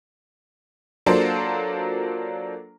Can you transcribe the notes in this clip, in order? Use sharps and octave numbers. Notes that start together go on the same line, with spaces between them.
F#3 A#3 D4 F4 A4 C5